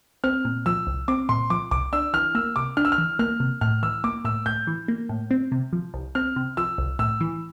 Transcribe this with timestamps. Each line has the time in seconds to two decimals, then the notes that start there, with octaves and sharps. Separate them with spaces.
0.24 C4 F6
0.45 A#2
0.66 F3 E6
0.87 C2
1.08 C4 D6
1.29 A#2 C6
1.50 F3 D6
1.71 C2 D6
1.93 D4 E6
2.13 E3 F6
2.35 A#3 E6
2.56 C3 D6
2.77 D4 F6
2.85 E6
2.92 F6
2.98 E3
3.19 A#3 F6
3.40 C3
3.61 A2 F6
3.83 E3 E6
4.04 A#3 D6
4.25 A2 E6
4.46 A2 G6
4.67 E3
4.88 A#3
5.09 A2
5.31 C4
5.52 C3
5.73 F3
5.94 C2
6.15 C4 F6
6.36 C3
6.57 F3 E6
6.78 C2
6.99 A2 E6
7.21 E3